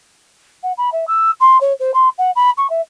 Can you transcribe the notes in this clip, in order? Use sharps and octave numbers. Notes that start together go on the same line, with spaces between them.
F#5
B5
E5
E6
C6
C#5
C5
C6
F#5
B5
C#6
E5